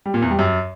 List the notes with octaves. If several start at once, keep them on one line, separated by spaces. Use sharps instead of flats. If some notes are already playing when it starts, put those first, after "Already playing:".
G3
A#2
E2
G3
F#2